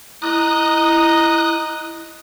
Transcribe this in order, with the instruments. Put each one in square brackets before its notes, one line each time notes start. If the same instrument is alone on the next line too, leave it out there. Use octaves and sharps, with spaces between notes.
[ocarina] E4 [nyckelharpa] D#5 A#5 [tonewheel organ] D#6 F#6